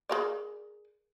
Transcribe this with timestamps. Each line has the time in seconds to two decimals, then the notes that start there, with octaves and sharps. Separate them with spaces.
0.09 G#4 A#4 D5